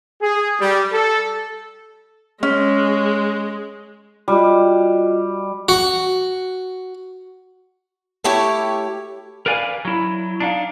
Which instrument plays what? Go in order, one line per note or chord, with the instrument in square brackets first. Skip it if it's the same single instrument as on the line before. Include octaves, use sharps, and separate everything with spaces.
[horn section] G#4
G3
A4
[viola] G#3 [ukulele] C#4
[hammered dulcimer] G3 [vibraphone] F4 F#4 D#5
[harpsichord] F#4
[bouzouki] A3 E4 G4 C#5
[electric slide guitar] A#4 B4 D5 F5 G#5
F#3 E4
D4 D#4 F5